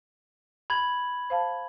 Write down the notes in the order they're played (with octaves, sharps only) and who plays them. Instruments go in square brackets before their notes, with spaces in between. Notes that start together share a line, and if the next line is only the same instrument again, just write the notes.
[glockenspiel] B5 G#6 F#7
[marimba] C5 F5 A5